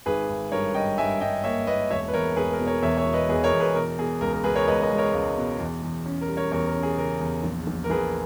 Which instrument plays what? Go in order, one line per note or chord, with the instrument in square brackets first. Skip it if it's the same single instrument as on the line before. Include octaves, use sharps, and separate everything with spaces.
[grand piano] G#1 G#4 B4
G#1
G2 A#4 C#5
G2 D#5 G5
G2 E5 G#5
G2 D#5 G5
A#3 C#5 E5
A#3 B4 D#5
E1 C#5 E5
B4
E2 A#4 C#5
E1 G#4 B4
A#4
B2
A#4 C#5
E2 C#5 E5
C#5 E5
B2
B4 D#5
E2 G#4 B4
A#4 C#5
E2
G#4 B4
B2 A#4
B2 G#4
C#2 A#4
A#4
C#2 G#4 B4
A#4 C#5
C#2 B4 D#5
B4 D#5
G#3
A#4 C#5
C#2
B2
E2
E2
C#4
A#4
G3
A#4 C#5
E2 A#4 C#5
A#4
C#4
G#4
C#3 A#4
E2
A#1
A#1
A#4
A#1 G#4 B4